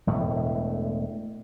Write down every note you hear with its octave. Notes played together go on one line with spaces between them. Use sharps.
E1 A2 A3